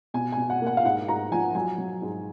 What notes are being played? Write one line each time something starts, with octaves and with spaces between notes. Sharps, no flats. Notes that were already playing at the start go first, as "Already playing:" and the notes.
B2 G#5
B2 G#5
F#5
A#3 F#5
F5
G#2 F#5
G#2 A#5
F3 G#5
F#3 G#5
F#3
G#2